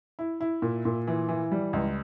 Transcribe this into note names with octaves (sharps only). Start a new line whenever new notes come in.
E4
E4
A#2
A#2
E3
E3
G3
C#2